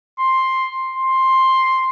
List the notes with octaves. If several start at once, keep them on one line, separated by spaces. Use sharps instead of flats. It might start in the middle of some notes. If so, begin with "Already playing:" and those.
C6
C6